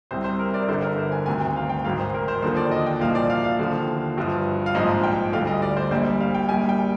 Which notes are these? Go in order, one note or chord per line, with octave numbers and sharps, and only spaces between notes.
C2 C3 G3 C5
C5
A#4
D5
G1 G2 D3 C5
A#4
C5
G#5
D2 C3 D#3 G#5
G5
F5
G5
G#1 G#2 D#3 F5
C5
A#4
C5
D#2 D3 F3 C5
D5
D#5
G5
C2 A#2 F3 F5
D5
F5
F5
D#2 D3 F3
G1 G2 F3
F5
A#1 G#2 F3 D#5
G5
D2 D3 G3 F5
D#5
D5
C5
A#1 A#2 G3 C5
F5
G5
A#1 A#2 G3 G#5
G5